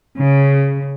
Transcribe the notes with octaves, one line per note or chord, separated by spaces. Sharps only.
C#3